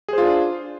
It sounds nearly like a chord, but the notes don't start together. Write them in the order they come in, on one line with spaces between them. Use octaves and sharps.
G#4 C5 F4 D4